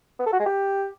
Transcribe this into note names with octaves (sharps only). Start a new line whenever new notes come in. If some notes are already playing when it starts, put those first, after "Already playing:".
B3
A4
F#4
G#3
G4